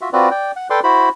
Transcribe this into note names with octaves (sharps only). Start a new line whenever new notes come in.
F4 F#4 E5
C4 F4 F#4 B4 D5
D5 G5
F#5
A4 B4 D5 G5 C6 D6
E4 F#4 C5 B5